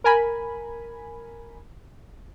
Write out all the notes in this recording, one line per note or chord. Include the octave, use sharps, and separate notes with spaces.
A#4 G#5 B5